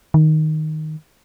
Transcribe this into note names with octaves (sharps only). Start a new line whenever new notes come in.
D#3